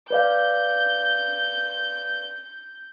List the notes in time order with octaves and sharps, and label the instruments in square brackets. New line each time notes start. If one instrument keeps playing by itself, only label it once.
[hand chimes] B4 D5 F5 [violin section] G6